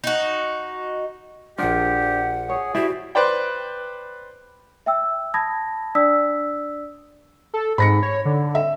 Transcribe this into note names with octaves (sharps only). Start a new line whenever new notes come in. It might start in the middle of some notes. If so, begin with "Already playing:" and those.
D#4 F#4
A#1 F3 D4 G4 F#5
G#4 C#5
E4 F#4 G4 C5 D5
B4 C5 D5 G5
E5 G5 E6
A5 B5 D#6 G#6 A#6
D4 D5 D#6 E6 B6
A4
G#2 B5 A#6 C#7
C#5
D3
E5